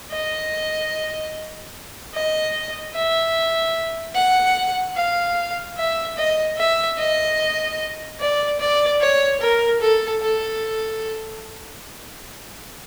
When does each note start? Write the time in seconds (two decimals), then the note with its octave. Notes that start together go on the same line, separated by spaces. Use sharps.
0.11 D#5
2.14 D#5
2.94 E5
4.14 F#5
4.96 F5
5.77 E5
6.17 D#5
6.57 E5
6.98 D#5
8.20 D5
8.59 D5
9.00 C#5
9.40 A#4
9.80 A4
10.21 A4